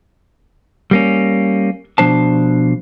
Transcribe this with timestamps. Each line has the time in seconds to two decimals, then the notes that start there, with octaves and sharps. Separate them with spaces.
0.91 G3 A#3 C#4
1.98 B2 F3 D4 C5 A5